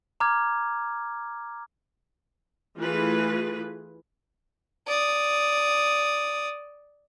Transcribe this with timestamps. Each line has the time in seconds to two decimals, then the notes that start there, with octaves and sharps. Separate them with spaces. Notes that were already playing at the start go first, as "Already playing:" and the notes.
0.20 A#5 D6 F6 G#6
2.79 E3 A3 F4 G#4 B4
4.88 D5 D#6